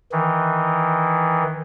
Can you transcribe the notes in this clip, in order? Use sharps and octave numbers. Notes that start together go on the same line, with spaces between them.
D#3 E3